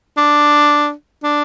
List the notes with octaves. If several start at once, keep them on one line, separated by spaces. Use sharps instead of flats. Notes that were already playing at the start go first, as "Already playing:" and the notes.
D4
D4